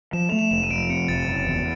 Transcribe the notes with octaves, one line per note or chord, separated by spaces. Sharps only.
F3 E7
A3 F7
E7
F1 E7
D#7
F2 D7
C3 C#7
F1 A6
F#1
E2